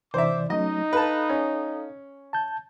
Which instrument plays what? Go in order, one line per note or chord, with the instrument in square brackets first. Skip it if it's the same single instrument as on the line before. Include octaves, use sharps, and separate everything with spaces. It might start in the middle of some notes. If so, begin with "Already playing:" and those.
[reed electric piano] C3 E3 D5 [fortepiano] C5 E5 [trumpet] D6
[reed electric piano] F#3 A3 C#4 [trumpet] D#4 [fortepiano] D#5
[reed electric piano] A4 F5 [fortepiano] B4 A5
[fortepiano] C#4
[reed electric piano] A5 G6